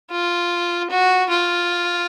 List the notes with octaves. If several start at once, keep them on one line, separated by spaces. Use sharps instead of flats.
F4
F#4
F4